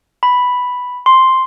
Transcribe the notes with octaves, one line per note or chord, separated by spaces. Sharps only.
B5
C6